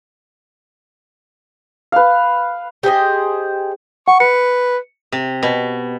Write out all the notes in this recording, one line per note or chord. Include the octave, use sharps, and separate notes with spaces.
B4 F5
G4 G#4 C5 D#5
F#5 C#6
B4 C#7
C3
B2